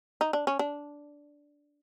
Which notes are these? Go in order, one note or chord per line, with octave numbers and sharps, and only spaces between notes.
D#4
D4
C#4
D4